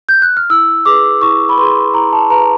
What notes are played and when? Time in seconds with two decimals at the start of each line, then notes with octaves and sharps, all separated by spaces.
0.09 G6
0.22 F#6
0.37 F6
0.50 E4 E6
0.86 G#4 B4 D6
1.21 E4 C#6
1.49 B5
1.57 G#4 B4 C6
1.94 E4 A#5
2.12 A5
2.30 G#4 B4 A#5